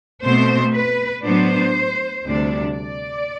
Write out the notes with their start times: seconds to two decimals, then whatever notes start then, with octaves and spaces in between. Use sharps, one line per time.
0.24 B2 A3 C4 C5
0.75 B4
1.24 A2 F#3 B3 D4 C5
2.25 D2 C3 G3 D4
2.75 D5